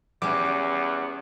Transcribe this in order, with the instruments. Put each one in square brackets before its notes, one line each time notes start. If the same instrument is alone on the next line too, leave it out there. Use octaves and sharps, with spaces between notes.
[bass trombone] E2 [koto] G3 C#4 [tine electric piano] D6